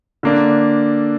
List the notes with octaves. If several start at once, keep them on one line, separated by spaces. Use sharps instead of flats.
D3 A#3 D4